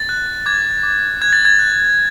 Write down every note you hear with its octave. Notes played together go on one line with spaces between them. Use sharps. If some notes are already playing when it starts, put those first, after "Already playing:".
Already playing: A6
F#6
D6 G#6
D6
F#6 G#6
A6
G#6
F#6